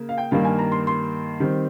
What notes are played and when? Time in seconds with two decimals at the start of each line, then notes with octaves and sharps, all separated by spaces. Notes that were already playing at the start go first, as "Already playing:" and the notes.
Already playing: C#3 A#3
0.09 F5
0.18 G5
0.31 G2 D#3 G3 A#3 F5
0.45 G#5
0.59 A#5
0.72 C6
0.87 C6
1.40 D#3 G3 C4